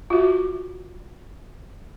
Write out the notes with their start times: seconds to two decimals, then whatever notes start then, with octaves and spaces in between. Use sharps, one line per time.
0.10 F4 F#4